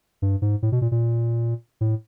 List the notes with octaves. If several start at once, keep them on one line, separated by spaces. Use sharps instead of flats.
G2
G#2
A2
B2
A#2
A#2
A2